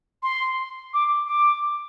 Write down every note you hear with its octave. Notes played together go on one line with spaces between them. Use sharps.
C6
D6
D6